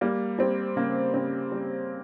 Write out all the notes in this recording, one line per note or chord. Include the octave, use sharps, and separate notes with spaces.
G3 A#3
G3 C4
C#3 A#3
C#3 C4
G3